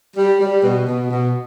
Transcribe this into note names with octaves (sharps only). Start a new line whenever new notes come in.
G3
G3
B2
B2
B2